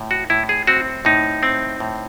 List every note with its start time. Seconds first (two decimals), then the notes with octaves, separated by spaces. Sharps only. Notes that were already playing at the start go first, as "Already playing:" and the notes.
Already playing: A2
0.11 F#4
0.30 A2 E4
0.49 G#4
0.67 C4 F#4
1.05 A2 D#4
1.43 C4
1.80 A2